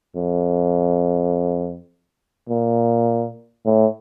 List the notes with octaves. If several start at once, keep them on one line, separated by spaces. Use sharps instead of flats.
F2
A#2
A2